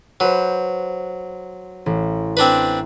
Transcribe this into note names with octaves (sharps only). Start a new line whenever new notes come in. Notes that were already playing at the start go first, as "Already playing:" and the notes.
F#3 B4 C5
A1
C4 D4 B4